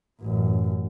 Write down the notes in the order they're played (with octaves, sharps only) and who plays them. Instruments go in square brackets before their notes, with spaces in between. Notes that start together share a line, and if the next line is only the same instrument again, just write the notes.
[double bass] A1 F#2